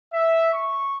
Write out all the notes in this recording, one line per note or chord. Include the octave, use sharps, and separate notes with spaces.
E5
C#6